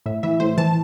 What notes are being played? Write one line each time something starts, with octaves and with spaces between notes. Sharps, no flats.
A2 E5
E3 E5
A2 C5
E3 A5